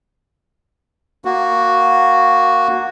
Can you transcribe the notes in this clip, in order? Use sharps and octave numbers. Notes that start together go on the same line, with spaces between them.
A#3 F#4